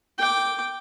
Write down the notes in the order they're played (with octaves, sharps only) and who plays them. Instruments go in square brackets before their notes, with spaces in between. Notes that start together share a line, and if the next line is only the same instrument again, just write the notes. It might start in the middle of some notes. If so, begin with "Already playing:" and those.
[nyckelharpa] G5 D6